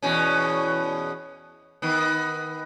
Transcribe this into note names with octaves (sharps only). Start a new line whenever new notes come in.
E2 B2 C#4
D#3 B3